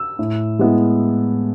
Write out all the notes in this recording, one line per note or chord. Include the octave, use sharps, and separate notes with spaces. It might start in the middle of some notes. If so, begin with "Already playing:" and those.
Already playing: E6
A2
G#3 B3 E4